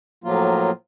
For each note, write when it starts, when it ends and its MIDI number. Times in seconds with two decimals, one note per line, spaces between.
0.24 0.71 45
0.24 0.71 53
0.24 0.71 54
0.24 0.71 58
0.24 0.71 65